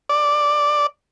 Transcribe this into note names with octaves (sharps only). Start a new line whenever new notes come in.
D5